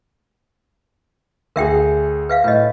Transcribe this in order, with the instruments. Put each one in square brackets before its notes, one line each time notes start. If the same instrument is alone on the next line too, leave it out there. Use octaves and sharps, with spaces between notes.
[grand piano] D2 G#4 [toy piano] A#4 E5 G5
[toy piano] B4 E5 F5
[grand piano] A2 [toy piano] B4 D#5